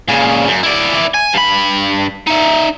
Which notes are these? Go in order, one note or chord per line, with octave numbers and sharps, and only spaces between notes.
A#2 C#3
F#2
E4 D5
G#5
G2 B5
D#4 E5